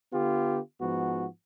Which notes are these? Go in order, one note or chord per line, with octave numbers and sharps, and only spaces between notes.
D3 B3 F4 G4
G#2 F3 B3 F#4